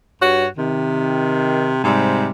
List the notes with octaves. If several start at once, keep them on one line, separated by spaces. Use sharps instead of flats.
G2 F#4 C#5
C3 D#3
G#2 C3 G3